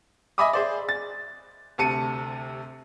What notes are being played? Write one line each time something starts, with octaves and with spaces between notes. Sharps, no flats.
D#5 E5 G#5 B5 D6 D#6
G#4 C5 D5
A6
D2 C3 A5 C#7 D#7